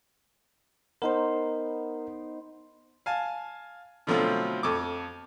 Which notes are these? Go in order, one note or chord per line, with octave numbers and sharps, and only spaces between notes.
B3 D#4 A#4 C5
F5 G#5 A5
B2 D3 F3 F#3 A3 C4
F2 A4 C#6 D6